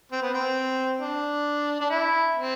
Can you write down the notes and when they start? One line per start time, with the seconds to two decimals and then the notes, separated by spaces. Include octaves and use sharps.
0.12 C4
0.23 B3
0.34 C4
1.01 D4
1.81 D4
1.90 E4
2.35 C4